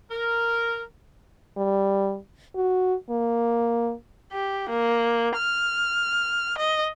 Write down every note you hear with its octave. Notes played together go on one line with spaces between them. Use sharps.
A#4
G3
F#4
A#3
G4
A#3
F6
D#5